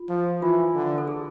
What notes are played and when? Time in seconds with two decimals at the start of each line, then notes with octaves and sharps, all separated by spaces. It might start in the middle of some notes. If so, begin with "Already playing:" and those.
Already playing: F4
0.09 F3
0.42 E3 F4
0.75 D3
0.98 A4
1.08 G#4